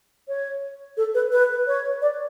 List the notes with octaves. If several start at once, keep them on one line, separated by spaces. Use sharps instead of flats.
C#5
A4
B4
B4
C#5
D5